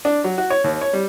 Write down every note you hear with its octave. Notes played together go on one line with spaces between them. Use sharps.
D4
F#3
F#4
C#5
D#2
C#5
G3